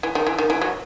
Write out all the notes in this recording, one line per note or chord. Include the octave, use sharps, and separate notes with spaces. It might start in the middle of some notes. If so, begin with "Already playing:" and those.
E3
D#3
E3
D#3
E3
F#3